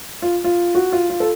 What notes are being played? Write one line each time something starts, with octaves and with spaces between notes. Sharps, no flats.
F4
F4
F#4
F4
F4
A4